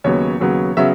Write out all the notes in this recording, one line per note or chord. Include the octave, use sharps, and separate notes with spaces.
D#2 C#3 F#3 B3 C#5
D#2 C#3 F#3 B3
C#3 F#3 B3 E5